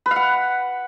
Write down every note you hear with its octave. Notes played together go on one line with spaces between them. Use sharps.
B4
F5
F#5